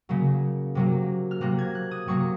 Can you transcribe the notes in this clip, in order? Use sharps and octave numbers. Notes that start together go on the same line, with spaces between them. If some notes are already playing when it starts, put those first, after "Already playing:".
C#3 F#3 A#3
C3 F#3 A#3
F6
C3 F#3 A#3 F#6
G#6
F#6
D#6
C3 F#3 A#3 C#6